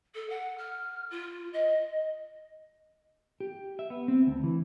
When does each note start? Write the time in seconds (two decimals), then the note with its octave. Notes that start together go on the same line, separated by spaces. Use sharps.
0.15 A4
0.30 F#5
0.58 F6
1.10 F4
1.53 D#5
3.40 G4
3.79 E5
3.90 B3
4.08 C4
4.27 D2
4.44 E3